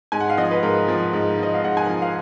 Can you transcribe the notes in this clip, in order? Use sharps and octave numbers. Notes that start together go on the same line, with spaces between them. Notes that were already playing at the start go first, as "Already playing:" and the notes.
G#2 G#5
F#5
F5
F3 D#5
B4
G#2 A#4
F3
G#2
F3 D#5
F5
G#2 F#5
G#5
F3
F5